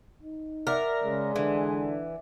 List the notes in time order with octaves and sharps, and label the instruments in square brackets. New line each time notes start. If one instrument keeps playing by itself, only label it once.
[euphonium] D#4
[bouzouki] A#4 [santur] D5 E5 F#5
[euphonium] C#3 [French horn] G#3
[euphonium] D3 [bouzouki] E3